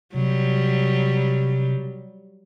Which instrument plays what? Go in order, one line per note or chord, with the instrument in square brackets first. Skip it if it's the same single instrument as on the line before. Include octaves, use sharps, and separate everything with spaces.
[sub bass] C3 [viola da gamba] F#3 G3